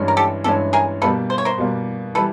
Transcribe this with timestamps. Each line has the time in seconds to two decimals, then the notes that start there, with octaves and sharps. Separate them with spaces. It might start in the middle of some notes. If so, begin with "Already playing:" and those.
Already playing: G2 E3 G#3 C#4
0.08 A#4
0.17 G4 A4
0.44 G2 E3 G#3 C#4 G4 A4
0.73 G#4 A#4
1.02 B2 G3 A#3 A4 B4
1.30 C5
1.38 C#5
1.45 A#4 C5
1.58 B2 G3 A#3
2.15 E3 G3 A4 B4